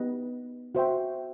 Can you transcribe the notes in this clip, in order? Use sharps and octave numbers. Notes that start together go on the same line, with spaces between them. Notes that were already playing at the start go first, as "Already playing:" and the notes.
Already playing: B3 D#4 G4 B4 D#5
F#4 C5 E5 G5